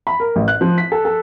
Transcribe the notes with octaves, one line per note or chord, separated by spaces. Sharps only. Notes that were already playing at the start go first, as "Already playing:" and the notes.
B5
A#4
A1
F#6
F3
B6
A4
A4